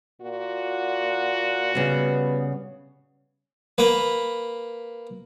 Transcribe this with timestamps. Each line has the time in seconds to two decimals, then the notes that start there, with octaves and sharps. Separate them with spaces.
0.21 A#2 F#4
1.75 C#3 G3 B3
3.78 A#3 B4